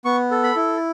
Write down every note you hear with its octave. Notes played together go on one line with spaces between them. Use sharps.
B3 C#6
A4
B5
E4